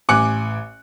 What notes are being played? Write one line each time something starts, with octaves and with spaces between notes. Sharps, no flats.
A1 G#5 D6 F#6 C#7